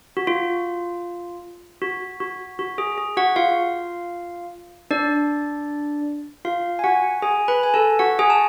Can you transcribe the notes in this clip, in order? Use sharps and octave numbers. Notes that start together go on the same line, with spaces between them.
F#4
F4
F#4
F#4
F#4
G#4
G#4
F#4 F#5
F4 F5
D4 D5
F4 F5
G#5
F#4 F#5
G#4 G#5
B4 B5
G#5
A4 A5
F#4 F#5
G#4 G#5
A5